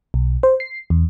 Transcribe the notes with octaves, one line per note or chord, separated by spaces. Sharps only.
B1
C5
C7
E2